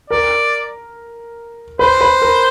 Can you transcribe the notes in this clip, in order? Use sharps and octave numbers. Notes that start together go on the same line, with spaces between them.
A#4 D5
B4 C5
B4
A#4